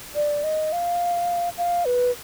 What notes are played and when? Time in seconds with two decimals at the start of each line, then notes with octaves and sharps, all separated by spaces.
0.15 D5
0.44 D#5
0.72 F5
1.58 F5
1.85 B4